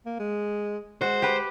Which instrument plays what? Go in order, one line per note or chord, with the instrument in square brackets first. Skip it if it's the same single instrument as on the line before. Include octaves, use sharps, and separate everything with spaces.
[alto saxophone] A#3
G#3
[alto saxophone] G#3 [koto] F#4 [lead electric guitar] C5
[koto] G4 B4